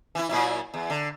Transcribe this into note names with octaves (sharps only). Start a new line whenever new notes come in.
E3 E4
A#2 F#3 E4
E2
D3